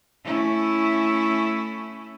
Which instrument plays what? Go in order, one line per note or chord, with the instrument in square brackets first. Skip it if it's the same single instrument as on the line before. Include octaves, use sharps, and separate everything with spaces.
[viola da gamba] A3 C#4 E4